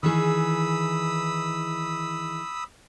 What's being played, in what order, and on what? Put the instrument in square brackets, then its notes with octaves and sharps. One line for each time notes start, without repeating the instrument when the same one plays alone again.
[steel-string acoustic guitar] D#3 E3 G#4 [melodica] B5 D#6 E6